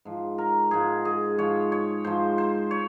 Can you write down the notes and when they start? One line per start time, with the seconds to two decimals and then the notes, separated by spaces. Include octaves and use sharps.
0.05 G#2 F3
0.38 A#4
0.71 G#2 F3 G#4
1.05 G#4
1.38 G#2 F3 C#5
1.72 C#5
2.05 G#2 F3 C5
2.38 C5
2.71 C#5